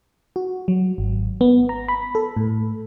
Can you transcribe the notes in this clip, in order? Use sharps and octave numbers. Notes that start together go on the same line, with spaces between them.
F#4
F#3
G#1
B3
A#5
B5
A4
A2